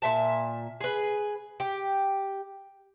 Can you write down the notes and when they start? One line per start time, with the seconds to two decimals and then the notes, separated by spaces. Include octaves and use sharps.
0.02 A#2 E5 A5
0.80 G#4 B4
1.60 G4